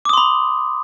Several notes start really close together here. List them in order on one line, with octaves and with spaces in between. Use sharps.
D6 D#6 C6 B5